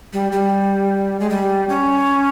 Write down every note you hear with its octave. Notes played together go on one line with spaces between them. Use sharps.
G3
G3
G#3
G3
C#4